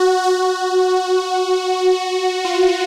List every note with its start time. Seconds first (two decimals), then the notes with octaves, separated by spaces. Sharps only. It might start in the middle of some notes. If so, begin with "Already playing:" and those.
Already playing: F#4
0.24 F#4
2.45 F4